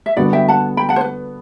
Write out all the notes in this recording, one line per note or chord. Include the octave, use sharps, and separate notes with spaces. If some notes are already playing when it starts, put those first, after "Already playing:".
E5
D3 G3 B3 D4 F#4 D5 F#5
E5 G5
F#5 A5
G5 B5
F#5 A5
C5
B4